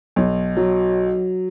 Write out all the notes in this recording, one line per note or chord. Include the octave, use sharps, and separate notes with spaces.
B1
F#3